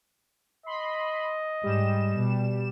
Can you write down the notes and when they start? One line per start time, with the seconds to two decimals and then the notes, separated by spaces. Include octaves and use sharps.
0.66 D#5 B5 C6
1.64 G#2 G3 E7
2.16 B2